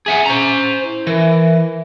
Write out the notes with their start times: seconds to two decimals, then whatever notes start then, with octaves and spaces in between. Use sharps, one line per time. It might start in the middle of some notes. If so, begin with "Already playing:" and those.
0.06 G#4 E5 F#5 G#5
0.26 C#4 C5 A#5 C#6
0.83 E4
1.07 E3 A#4 E5